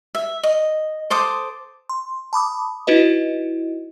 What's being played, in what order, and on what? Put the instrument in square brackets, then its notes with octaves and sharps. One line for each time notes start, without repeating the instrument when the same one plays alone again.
[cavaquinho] E5
D#5
A4 C5 D6 D#6
[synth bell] C6
A5 B5 D6 D#6
D#4 E4 F#4 B4 D#5